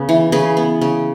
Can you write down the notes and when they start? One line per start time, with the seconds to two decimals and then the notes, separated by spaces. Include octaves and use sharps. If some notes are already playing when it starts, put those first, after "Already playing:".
Already playing: C#3 B3
0.09 E3
0.32 C#3 G#4 B4
0.57 B3
0.81 C#3